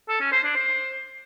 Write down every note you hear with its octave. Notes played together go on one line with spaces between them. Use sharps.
A4
C#4
C5
D4
C5